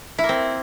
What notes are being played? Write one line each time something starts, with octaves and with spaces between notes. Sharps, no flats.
E4
A#3
C4